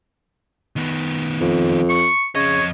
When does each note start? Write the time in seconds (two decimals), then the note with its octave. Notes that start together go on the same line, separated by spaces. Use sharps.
0.76 D#3 B3
1.41 F2
1.90 C#6
2.35 F2 C#3 C#5 D#5